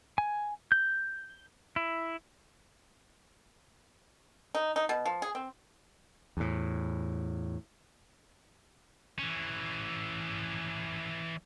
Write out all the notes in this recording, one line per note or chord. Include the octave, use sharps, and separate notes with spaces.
G#5
G6
E4
D#4
D#4
B2
F3
G#4
C4
E2 A2
E3 C#4